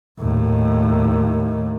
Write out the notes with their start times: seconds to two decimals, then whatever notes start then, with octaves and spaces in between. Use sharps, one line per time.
0.20 D#2 A2